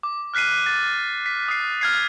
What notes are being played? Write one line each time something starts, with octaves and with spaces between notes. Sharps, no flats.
D6
F6 F#6 B6 C7 D#7
A6
B6
D#6 C7
F6 G#6 C7